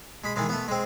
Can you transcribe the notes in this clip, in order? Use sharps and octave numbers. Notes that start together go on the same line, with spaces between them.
G#3 B5
D#3 E3 G#3
A3 B3
G#3 C4